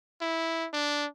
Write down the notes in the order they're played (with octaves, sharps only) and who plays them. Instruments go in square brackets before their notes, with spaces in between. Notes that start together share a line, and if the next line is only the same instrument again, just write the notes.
[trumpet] E4
D4